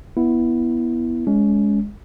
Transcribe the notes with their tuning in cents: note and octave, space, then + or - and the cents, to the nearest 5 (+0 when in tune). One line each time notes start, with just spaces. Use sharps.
B3 -10 E4 +0
G#3 +0 C#4 +25